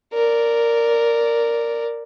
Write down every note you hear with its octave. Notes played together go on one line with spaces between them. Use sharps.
A#4 D5